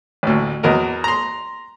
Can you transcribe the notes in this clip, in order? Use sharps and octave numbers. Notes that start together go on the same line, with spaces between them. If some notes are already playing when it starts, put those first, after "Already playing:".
A1 D2
E2 F#3 A#4 D#5
A#5 C6